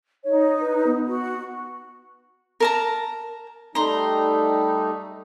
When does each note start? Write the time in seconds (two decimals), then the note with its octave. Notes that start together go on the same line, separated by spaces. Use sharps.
0.24 D#4 C#5
0.60 B4
0.87 B3
1.07 F#4
2.60 A#4 A5 A#5
3.75 G3 A3 D#4 A#5 C6